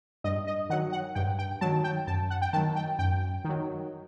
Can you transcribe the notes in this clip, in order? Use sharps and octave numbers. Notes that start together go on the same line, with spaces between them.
G2 D#5
D#5
D#3 F#3 F#5
F#5
G2 G5
G5
D#3 F#3 A5
G5
F#2 A5
F#5
G5
D#3 F#3 A5
G5
F#2 G5
D#3 F#3